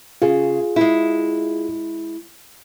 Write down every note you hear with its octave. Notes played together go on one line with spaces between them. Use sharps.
C#3 F4 G#4
G#3 E4